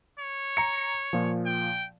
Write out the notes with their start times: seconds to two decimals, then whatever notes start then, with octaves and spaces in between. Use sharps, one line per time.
0.20 C#5
0.57 A#5 C#7
1.13 A#2 F3
1.46 G5